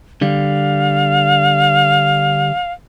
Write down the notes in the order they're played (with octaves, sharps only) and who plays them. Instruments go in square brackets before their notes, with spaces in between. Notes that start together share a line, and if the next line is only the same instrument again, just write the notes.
[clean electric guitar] D3 G3 [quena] F5